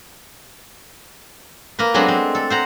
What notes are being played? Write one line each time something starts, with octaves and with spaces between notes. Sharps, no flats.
A#3 A#4 B4
F#3 G#3 A3 B3 C4 D4
C4
A4
C5 F#5 A#5